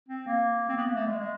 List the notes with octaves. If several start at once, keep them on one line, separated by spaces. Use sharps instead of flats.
C4
A#3
C4
B3
A#3
A3
G#3
G#3